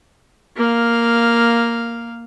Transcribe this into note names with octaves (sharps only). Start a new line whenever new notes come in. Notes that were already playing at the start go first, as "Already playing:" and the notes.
A#3 F5